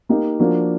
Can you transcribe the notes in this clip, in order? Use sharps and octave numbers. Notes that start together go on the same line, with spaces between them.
A#3 D#4 G4
F3 A#3 D4 F#4